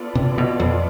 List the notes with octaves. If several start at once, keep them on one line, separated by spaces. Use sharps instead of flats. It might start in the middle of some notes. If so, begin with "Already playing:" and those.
Already playing: B3 F4 A4 D5
C3
B2
F2